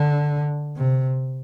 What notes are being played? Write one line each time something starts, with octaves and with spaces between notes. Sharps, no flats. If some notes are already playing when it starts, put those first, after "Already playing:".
Already playing: D3
C3